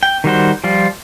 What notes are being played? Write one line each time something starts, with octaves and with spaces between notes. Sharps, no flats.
G5
D#3 G3 F#4 C5
F3 G3 F4